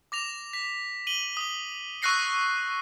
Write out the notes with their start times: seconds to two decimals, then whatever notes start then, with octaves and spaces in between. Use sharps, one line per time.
0.12 D6 A#6 F7
0.53 B6
1.07 D#7 F#7 G7
1.37 D#6 F#7
2.02 C#6 E6 F#6 A#6 C7 C#7